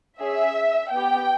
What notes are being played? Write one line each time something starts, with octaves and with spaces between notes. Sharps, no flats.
C#4 G#4 E5
B3 G4 G5